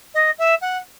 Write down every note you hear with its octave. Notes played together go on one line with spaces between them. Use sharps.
D#5
E5
F#5